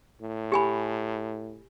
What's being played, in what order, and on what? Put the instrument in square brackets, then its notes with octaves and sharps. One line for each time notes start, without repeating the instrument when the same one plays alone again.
[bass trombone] A2
[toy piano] G4 G#5 B5